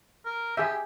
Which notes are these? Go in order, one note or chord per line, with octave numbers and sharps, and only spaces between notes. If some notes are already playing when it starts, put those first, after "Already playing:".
A#4
G4 G#4 E5